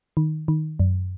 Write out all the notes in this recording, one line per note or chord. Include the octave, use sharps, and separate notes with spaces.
D#3
D#3
F#2